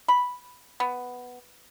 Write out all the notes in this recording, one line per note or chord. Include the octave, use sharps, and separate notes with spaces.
B5
B3